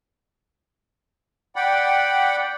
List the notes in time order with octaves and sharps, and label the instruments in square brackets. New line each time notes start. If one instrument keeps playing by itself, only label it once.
[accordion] D5 F#5 G5 B5